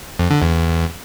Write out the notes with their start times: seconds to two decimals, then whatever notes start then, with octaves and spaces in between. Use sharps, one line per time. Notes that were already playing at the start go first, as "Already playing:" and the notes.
0.19 F2
0.31 D3
0.42 E2